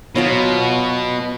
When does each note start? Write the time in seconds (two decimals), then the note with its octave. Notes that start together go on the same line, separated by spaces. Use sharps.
0.16 B2 F#3 F4 C#5